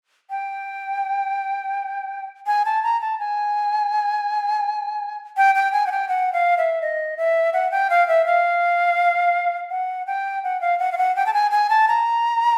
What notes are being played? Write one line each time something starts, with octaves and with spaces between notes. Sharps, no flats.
G5
G#5
A5
A#5
A5
G#5
G5
G5
G#5
F#5
G5
F#5
F5
E5
D#5
E5
F#5
G5
F5
E5
F5
F#5
G5
F#5
F5
F#5
F5
F#5
G5
A5
G#5
G#5
A5
A#5